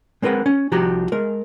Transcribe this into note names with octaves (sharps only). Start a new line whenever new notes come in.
G#3 C4 A#4 B4 F#5
C#4
C2 F3 F#4 G4 A#5
G#3 A#4